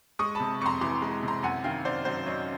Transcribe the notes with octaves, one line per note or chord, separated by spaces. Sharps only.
G#3 C#6 D#6
C3 A5 B5
F2 A#5 C6 C#6
E3 C6 D6
G#3
C3 A#5 C6
F#2 F#5 G#5
D#3 F5 G5
F#2 C5 D5
F#3 C5 D5
F#2 C#5 D#5